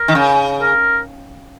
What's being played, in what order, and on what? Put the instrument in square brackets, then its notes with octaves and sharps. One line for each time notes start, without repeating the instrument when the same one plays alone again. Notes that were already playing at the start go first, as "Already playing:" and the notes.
Already playing: [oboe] A#4
[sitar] D#3
C#3
[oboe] A#4